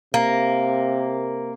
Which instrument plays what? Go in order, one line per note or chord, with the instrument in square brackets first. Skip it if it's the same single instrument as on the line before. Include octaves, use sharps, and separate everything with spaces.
[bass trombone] C3 [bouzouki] A#3